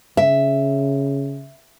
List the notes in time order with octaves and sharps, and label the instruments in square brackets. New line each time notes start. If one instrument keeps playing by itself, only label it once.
[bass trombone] C#3 [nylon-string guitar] E5